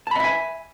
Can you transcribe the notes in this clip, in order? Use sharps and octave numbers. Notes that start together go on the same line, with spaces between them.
D#5 E5 G#5 A5 B5